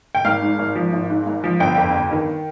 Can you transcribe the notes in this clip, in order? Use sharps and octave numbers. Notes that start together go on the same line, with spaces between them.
G5
G#1 F5
G#2
G#1
F3
G#1
G#2
G#1
F3
G1 G5
F2
G1
D#3